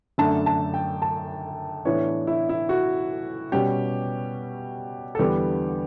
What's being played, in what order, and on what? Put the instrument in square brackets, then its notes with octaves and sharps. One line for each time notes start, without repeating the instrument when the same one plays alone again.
[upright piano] F#2 D3 A3 D4 A5
A5
G5
A5
A2 E3 B3 D4 C#5
E4
E4
F#4
B2 G3 C#4 G4
A4
E2 D3 G3 B3 D4 G4